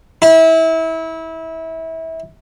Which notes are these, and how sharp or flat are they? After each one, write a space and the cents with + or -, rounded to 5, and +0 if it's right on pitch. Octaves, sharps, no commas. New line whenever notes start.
E4 -25